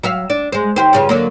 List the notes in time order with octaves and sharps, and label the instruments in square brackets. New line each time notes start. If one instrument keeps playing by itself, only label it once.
[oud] F#3 E5 F5
D4
G#3 C5
D#2 G4 C5
G2 C#3 F4
D3 F#3 A#3